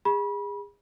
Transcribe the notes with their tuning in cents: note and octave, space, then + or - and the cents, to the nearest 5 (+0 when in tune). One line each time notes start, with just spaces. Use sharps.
G#4 -30 B5 -25